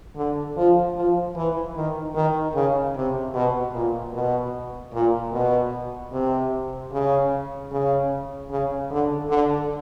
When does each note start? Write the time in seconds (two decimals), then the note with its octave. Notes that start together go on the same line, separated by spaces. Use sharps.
0.16 D3
0.57 F3
0.96 F3
1.36 E3
1.76 D#3
2.15 D#3
2.55 C#3
2.95 C3
3.34 B2
3.74 A#2
4.14 B2
4.94 A#2
5.33 B2
6.12 C3
6.92 C#3
7.72 C#3
8.50 C#3
8.90 D3
9.30 D3